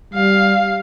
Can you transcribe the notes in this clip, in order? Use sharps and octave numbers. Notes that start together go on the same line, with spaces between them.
G3 F5